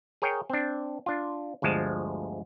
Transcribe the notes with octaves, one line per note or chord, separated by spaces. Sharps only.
G#4 A#4 C#5 G5
C4 D4
D4 F4
G1 D2 F3 G#3 A5